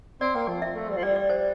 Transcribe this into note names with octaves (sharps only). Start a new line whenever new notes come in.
C4 D5
A#3 G5
F3
E5
A3
G3
F3
G3 D5
D5
C5